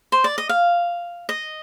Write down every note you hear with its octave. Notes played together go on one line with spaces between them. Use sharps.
C5
D5
D#5
F5
D#5